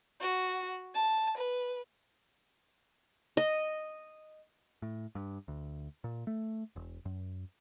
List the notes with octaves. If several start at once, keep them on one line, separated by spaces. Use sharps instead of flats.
F#4
A5
B4
D#5
A2
G2
D2
A#2
A3
E1
F#2